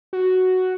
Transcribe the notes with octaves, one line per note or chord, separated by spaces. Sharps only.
F#4